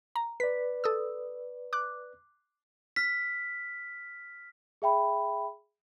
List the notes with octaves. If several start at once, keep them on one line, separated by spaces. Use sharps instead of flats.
A#5
B4 D5 B6
A4 D#6 E6
D6 F#6
F6 B6
G#4 E5 G5 B5